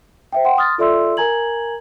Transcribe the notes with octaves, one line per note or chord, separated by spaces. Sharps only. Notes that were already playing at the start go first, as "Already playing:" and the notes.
C5 E5 G5
F#5 G5 C6
C6 D#6 F6 A6
F4 A4 D5 E5 C6 E6
A#4 G#5 A#5 G#6 F#7